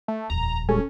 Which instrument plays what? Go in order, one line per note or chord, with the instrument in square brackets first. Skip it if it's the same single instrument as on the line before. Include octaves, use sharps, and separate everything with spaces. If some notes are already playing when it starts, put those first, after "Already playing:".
[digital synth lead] A3
[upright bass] D#1 F2 [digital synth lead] A#5
[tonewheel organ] A#2 G3 G#3 [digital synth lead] C#4 [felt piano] A4